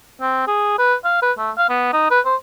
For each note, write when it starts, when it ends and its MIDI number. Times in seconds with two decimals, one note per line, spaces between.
0.21 0.44 60
0.47 0.78 68
0.79 0.95 71
1.05 1.18 77
1.22 1.32 71
1.38 1.51 57
1.58 1.69 77
1.69 1.90 59
1.93 2.06 63
2.11 2.20 71
2.26 2.36 72